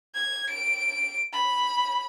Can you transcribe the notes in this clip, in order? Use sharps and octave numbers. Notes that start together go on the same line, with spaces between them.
G#6
D7
B5